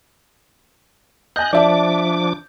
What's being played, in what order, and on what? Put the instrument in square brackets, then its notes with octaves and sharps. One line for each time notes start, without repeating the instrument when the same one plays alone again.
[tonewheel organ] D#5 F#6 [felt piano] G#5 G6
[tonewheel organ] F3 D4 D6 [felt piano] D5 E5 A5